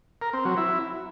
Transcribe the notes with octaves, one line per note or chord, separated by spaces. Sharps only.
A#4
C4
F#3
E4